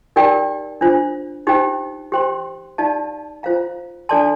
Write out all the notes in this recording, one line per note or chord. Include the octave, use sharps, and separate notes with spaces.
D#4 G4 A#4 D5 G5
D4 F4 C5
D#4 G4 C5 G5
G4 C5 G5 C6
D#4 G4 D5 F5 A5
F4 C5 F5 A#5
D4 A4 D5 A5 C6